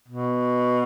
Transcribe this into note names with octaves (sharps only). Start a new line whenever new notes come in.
B2